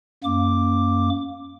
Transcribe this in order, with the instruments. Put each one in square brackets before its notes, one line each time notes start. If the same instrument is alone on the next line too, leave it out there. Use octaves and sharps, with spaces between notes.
[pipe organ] F#2 A#3 D6